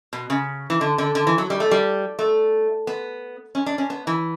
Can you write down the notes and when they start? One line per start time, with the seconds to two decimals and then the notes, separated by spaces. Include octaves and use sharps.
0.13 B2
0.30 C#3
0.70 E3
0.81 D3
0.98 D3
1.15 D3
1.27 E3
1.38 F#3
1.50 G3
1.60 A3
1.71 G3
2.19 A3
2.87 B3
3.55 C#4
3.66 D4
3.78 C#4
3.90 B3
4.07 E3